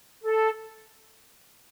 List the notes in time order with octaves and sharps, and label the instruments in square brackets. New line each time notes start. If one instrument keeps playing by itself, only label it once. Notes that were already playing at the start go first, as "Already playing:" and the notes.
[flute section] A4